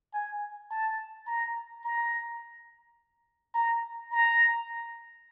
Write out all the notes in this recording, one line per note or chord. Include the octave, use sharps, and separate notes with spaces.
G#5
A5
A#5
A#5
A#5
A#5